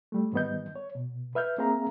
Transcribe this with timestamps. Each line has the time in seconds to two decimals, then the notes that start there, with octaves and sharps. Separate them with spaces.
0.12 G3 A3
0.33 G#2 D#3 G3 B3 D#5 G6
0.76 C#5
0.95 B2
1.35 B4 E5 F6 G6
1.58 A#3 C4 G#4 E5 F5 A#5